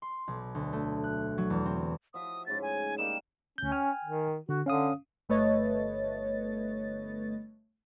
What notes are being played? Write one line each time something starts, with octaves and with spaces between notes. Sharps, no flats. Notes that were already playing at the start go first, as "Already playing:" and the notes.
C6
B1
D2
A3
F#6
F#3
E2
C4
F3 F#4 E5 D#6
G#2 C#3 A3 A6
G#5
G3 A#3 D#4 E7
D2 C#4 G6
G5 G#5 F6
D#3
D3 F#4
D3 C#4 F5 D#6
G1 A3 B4 C#5 D#5 A6